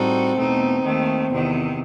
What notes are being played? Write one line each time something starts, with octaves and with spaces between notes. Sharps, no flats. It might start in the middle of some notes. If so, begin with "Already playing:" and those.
Already playing: A2 G3 C4 D#4 F#4 A4
E2 B2 A3 D#4
D#2 D#3 A3
E2 C3 D#3